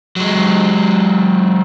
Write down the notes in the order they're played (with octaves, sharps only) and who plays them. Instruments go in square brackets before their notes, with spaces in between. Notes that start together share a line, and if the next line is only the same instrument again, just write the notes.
[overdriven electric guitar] F#3 G#3